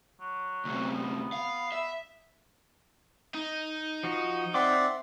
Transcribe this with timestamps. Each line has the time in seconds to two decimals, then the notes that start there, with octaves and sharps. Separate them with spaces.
0.20 F#3
0.65 D2 C3
0.94 B3
1.32 F5
1.72 E5
3.35 D#4
4.03 F3 F#4
4.54 C4 D5 E5 F#5 C6 D6